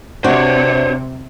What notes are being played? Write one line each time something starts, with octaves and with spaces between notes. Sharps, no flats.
C3 C4 D4 F#4 C5 C#5